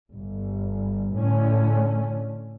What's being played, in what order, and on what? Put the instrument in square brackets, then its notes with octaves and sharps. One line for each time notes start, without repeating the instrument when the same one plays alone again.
[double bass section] G1
A2 D3 A3 C#4